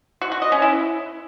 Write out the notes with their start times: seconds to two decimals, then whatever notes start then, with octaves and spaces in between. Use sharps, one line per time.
0.21 F#4
0.32 F#4
0.42 D#5
0.52 C#4
0.62 E4